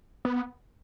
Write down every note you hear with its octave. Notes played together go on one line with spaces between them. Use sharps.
B3